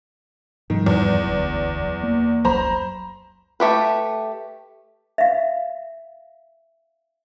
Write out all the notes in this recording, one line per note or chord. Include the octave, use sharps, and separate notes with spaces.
G#2 D#3 F3 G3
E2
F#1 D2 F#3
A#3
F#1 C#2 F#3 C5 A#5 B5
A3 G4 B4
E5 F5